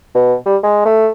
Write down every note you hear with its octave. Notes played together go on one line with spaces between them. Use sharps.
B2
G3
G#3
A3